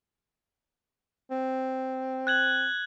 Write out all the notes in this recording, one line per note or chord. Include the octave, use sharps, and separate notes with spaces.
C4
F#6 G#6 F#7